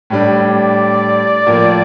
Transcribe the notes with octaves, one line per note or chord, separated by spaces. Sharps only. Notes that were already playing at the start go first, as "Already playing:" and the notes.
A2 G3 D4
D5
A2 F3 A#3